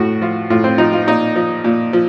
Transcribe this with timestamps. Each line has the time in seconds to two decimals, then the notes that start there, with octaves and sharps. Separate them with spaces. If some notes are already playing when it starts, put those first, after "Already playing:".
Already playing: A2 F#4
0.21 F3 F4
0.50 A2 F4
0.64 C4
0.78 F3 D#4
0.93 F4
1.07 A#2 D#4
1.36 F3
1.64 A#2
1.93 F3